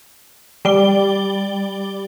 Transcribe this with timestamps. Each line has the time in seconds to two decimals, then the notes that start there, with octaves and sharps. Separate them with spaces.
0.65 G3 D5 G7